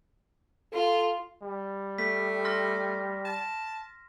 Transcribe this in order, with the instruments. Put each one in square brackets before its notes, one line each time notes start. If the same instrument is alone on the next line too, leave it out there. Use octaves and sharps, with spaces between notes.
[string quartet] F4 [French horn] A4
[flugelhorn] G3
[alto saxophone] A3 [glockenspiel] B6
[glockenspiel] C6 F6 A#6
[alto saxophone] A5